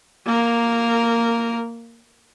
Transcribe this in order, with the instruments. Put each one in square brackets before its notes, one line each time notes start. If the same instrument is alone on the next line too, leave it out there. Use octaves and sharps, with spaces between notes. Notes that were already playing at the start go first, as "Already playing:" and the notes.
[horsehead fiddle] A#3 A#4